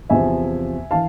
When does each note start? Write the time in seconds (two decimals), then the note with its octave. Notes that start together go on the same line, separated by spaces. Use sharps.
0.09 E2 C3 F3 E5 G#5
0.91 E3 F5 A5